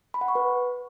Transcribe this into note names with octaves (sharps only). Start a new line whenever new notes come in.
B5
F#5
C#6
B4